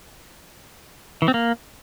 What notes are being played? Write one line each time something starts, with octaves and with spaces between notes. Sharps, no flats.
E3
C4
A#3